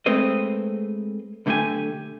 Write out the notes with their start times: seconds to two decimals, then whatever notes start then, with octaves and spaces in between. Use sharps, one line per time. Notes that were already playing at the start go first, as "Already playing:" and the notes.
0.06 G#3 A3 C4 B4 D#5
1.46 B1 D3 A3 A#3 G4 G#5